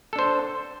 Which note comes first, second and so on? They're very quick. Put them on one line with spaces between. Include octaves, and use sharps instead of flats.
A4 D4 C5